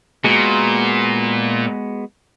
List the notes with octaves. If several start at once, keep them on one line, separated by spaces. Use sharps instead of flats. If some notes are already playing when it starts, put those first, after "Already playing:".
A#2 G#3 B3 F#4